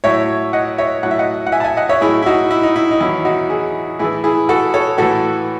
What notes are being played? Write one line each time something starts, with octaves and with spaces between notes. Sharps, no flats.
A2 F#3 C#5 E5
D#5 F#5
C#5 E5
A2 F#3 F#5
E5
D#5 F#5
F#5
E5 G#5
A5
E5 G#5
D#5 F#5
C#5 E5
A2 F#3 E4 G#4
E4
D#4 F#4
E4
D#4
E4
D#4
E2 D#3 F#3 E4
D#4 F#4
E4 G#4
A2 E3 E4 G#4
E4 G#4
F#4 A4
A4 C#5
A2 E3 F#4 A4